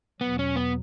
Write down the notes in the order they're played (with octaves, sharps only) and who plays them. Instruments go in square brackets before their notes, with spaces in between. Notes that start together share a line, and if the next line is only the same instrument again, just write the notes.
[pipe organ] E2 B2 F#3 [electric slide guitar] B3
[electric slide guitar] C#4
B3